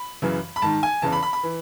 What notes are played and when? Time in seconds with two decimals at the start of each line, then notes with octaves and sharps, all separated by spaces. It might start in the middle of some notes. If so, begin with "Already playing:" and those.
Already playing: B5
0.22 F#2 C#3 E3
0.56 B5
0.62 G#2 D#3 A5
0.83 G#5
1.02 E2 C#3 E3 A5
1.12 B5
1.23 B5
1.33 B5
1.43 E3